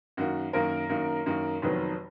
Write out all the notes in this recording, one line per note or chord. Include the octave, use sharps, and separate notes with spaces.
F#2 D#3 A#3 F#4
F#2 D#3 A#3 A#4
F#2 D#3 A#3
F#2 D#3 A#3
F1 F2 D#3 F#3 B3